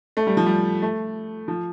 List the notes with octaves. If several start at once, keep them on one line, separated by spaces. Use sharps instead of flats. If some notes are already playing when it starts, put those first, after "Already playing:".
A3
G3
F3
G3
A3
F3